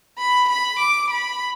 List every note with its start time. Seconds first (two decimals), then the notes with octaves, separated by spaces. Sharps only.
0.19 B5
0.49 B5
0.80 D6
1.10 B5